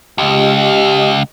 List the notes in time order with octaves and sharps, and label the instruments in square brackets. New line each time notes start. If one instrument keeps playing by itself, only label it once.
[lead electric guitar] C#2 [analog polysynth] G4 D#5